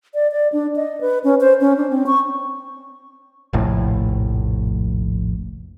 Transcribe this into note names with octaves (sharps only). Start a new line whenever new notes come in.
D5
D5
D4
D#5
B4
C#4
C5
C#4
D4
C4
C#6
F1 A#1 A2